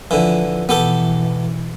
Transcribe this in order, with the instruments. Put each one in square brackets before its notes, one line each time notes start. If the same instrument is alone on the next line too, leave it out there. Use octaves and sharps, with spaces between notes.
[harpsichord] D3 E3 [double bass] F3
[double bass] B2 E3 [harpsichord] B3 G4 A4